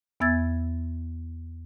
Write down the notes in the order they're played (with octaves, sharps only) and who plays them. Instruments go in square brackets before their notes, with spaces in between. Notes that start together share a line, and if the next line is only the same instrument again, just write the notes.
[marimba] E2 B3 E5 E6 G#6 A6